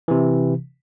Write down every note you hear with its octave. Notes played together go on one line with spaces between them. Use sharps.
C3 E3